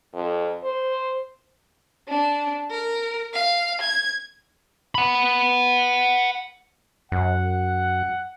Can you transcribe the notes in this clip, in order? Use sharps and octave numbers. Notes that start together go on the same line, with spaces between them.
F2
C5
D4
A#4
F5
G#6
F#5 B5
F#2 F#5